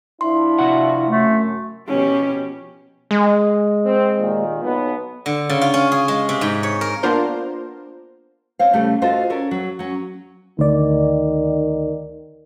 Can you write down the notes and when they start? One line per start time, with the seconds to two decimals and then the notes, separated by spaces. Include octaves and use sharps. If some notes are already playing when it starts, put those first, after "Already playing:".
0.21 F3 D4 E4 C6
0.59 C3 F#4 F#5
1.09 F#2 A3
1.88 B2 F3 C#4 G4
3.11 G#3
3.85 C4
4.19 D#2 A#2 D#3
4.63 B1 B3
5.26 D3
5.49 C#3
5.61 F4
5.74 C#4
5.92 G#4
6.08 G#3
6.29 C3
6.41 G#2
6.63 C#5
6.81 A#4
7.03 A#3 B3 D4 F4 A#4 C5
8.59 C4 C5 C#5 F5
8.73 C#3 G3 A3
9.02 F4 F#4 A4 C5 D#5 F5
9.30 C#4 A4 A#4
9.51 F#3
9.79 F#3 C#4
10.59 D2 D#3 D5